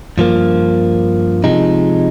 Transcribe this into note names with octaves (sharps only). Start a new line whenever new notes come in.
G2 F3 A#3
C3 F3 G#3 D#4